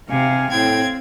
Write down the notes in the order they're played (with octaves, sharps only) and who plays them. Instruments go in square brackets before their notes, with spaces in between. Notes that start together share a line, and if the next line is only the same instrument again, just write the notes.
[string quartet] C3 [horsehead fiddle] F5 [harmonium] G#5
[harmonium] A2 G5 [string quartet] C4 G#6